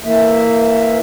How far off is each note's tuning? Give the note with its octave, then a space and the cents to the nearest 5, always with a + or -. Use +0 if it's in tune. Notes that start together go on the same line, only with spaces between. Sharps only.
E3 +0 A#3 -20 E5 +0